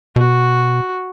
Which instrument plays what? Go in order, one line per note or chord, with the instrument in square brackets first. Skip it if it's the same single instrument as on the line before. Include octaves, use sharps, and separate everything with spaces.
[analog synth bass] B2 [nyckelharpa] F#4